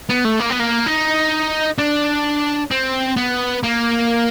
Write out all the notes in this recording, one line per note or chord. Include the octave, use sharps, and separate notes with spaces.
B3
A3
A#3
B3
A#3
D#4
D4
C4
B3
A#3